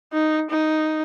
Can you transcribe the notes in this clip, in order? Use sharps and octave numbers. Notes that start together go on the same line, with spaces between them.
D#4
D#4